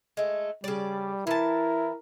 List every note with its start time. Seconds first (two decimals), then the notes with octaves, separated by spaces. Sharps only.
0.17 G#3 A3
0.64 C#3 G3 D5
1.27 E3 E4 A#4 A5